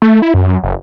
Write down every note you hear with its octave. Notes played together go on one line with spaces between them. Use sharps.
A3
E4
F#2
F#1